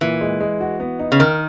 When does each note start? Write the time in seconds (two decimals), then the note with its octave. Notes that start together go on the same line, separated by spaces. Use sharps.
0.01 A#2 E3
0.21 G#3
0.40 G#3
0.61 F#4
0.80 B3
0.99 D#4
1.12 C#3
1.19 D#3 A#4